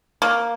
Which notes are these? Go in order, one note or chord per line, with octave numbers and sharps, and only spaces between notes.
A#3